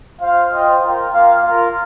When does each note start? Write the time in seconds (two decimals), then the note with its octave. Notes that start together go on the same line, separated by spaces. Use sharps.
0.21 F4 C5 F5
0.52 F4 C5 D#5 G5
0.82 F4 A#4 G5
1.13 A#3 F4 A#4 F5
1.44 F4 A#4 F5